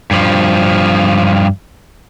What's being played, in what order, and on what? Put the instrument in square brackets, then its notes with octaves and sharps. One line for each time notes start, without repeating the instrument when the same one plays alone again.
[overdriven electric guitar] G2 F3